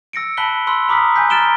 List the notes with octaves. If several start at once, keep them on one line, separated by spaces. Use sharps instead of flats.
E6 A#6 C#7 D7
A5 B5 F#6 B6 G7
B5 C6 E6 F#6
A#5 B5 D6 D#6 F6 B6
G#5 F#6 G6 B6
A#5 F6 A6 D7 E7 G7